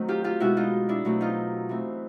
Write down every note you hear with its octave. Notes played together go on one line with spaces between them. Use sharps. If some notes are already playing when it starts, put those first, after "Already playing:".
Already playing: D#3 F#3 A3 C4
F4 G4
F4 G4
B2 G#3 B3 E4 F#4
D#4 F4
D4 E4
B2 F#3 A3 C4
D#4 F4
E3 A3 C4